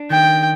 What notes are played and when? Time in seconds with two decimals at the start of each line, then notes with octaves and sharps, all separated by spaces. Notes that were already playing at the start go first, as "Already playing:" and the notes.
Already playing: D4
0.10 D#3 G5